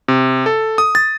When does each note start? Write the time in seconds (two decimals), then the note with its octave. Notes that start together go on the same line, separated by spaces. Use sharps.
0.08 C3
0.46 A4
0.78 D#6
0.95 A6